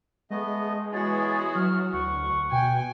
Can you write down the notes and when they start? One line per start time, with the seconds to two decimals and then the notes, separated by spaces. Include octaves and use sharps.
0.30 G#3 A3 B3 D#5
0.94 E3 B3 F#4 G#4 C#5 A6
1.55 F#3 F6
1.93 D2 F#5 C#6
2.52 B2 G5 G#5